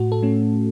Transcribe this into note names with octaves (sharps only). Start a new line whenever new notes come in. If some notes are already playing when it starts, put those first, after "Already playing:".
Already playing: A2 F#4
A4
A3 C#4